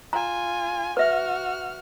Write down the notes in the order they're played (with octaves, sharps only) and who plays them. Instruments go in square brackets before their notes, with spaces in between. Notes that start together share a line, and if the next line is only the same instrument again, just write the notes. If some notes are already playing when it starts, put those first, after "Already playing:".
[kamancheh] F4 G#5 [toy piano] A#5
[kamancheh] F#4 F6 [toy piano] B4 E5